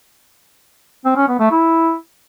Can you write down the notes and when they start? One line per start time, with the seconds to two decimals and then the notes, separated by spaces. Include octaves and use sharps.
1.05 C4
1.16 C#4
1.28 B3
1.39 A3
1.51 E4